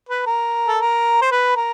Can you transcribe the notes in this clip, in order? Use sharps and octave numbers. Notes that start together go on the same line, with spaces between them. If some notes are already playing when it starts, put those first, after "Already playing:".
B4
A#4
A4
A#4
C5
B4
A#4